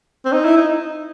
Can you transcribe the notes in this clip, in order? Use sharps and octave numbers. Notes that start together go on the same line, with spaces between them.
C4
D#4
E4
D#4